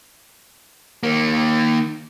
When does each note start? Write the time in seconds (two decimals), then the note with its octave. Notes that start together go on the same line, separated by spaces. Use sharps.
1.03 D#3 A#3